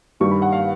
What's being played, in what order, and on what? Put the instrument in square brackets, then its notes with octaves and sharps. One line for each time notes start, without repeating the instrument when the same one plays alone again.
[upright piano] G2 D#3 G3 C#6
B5
F#5
F5